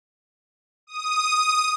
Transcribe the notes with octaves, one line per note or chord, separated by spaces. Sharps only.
D#6